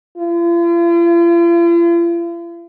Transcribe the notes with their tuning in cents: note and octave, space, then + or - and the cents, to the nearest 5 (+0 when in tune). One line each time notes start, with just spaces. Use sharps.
F4 -45